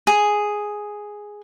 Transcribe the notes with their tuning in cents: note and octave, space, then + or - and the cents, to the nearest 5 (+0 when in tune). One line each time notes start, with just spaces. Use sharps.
G#4 +0